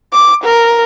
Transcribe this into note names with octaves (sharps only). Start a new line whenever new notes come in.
D6
A#4